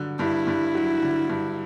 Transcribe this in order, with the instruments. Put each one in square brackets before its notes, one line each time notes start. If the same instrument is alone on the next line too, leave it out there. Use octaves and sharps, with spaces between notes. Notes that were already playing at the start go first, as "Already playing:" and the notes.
Already playing: [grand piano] G2 D3 F#3
[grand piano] G2 [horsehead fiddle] E4
[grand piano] G2
F#3
D3
G2